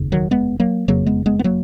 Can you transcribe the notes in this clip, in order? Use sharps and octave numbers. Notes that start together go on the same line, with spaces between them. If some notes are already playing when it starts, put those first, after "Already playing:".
Already playing: F1 D#2 C#3
D#3 F#3
G#3 B3
F#3 A#3
F#1 F2 C#3 F#3 A#3
G#3 B3
G#3 B3
B3
F#3 A#3